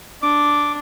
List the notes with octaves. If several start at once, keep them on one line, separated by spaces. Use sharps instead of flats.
D4 D6